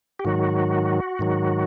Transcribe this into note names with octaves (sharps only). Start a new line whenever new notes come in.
G4
G#2 D#3 F#3 F#4
G#2 D#3 F#3